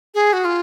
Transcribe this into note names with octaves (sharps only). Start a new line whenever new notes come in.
G#4
F#4
F4